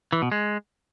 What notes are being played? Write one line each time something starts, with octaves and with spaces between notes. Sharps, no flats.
E3
B2
G#3